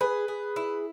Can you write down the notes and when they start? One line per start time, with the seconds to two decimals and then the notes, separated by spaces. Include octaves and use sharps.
0.01 G#4 B4
0.28 G#4
0.56 E4